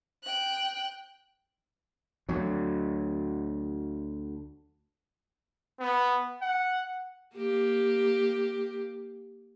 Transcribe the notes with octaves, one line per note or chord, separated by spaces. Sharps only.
G5 F#6
D2 F#3
B3
F#5
A#3 G4